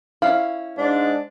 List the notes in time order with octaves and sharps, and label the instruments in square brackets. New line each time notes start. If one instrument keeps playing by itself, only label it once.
[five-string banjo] C#4 E4 [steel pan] F5
[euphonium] G#2 [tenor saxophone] D4